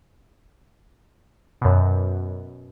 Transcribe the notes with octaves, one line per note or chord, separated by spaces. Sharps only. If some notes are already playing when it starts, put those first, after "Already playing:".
F#2 B2